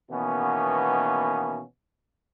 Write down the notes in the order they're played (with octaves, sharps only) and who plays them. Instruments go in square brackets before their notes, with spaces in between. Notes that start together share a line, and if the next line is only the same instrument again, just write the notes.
[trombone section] B2 D#3 E3 A#3 B3 C#4